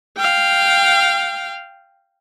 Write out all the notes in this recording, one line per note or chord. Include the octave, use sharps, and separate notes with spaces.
F5 G5